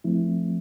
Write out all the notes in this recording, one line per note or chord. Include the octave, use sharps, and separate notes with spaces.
F3 A3 C4 E4